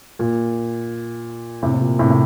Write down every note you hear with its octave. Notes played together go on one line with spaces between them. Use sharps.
A#2
A2 C3
C3
A#2
A2 C3
C3